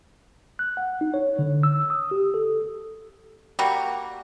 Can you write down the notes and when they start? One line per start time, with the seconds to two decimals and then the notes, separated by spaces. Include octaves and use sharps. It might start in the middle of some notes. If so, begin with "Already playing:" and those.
0.59 F#6
0.77 F#5
1.01 D#4
1.14 C#5
1.39 D3
1.63 E6
1.90 D#6
2.11 G4
2.34 A4
3.59 G3 A#3 F#4